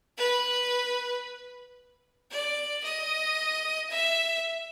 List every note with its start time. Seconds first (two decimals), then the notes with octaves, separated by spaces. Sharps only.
0.18 B4
2.31 D5
2.84 D#5
3.90 E5